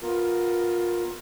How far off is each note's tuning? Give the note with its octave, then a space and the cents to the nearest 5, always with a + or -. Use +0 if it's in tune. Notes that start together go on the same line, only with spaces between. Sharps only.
B3 +0 F4 +20 A#4 +0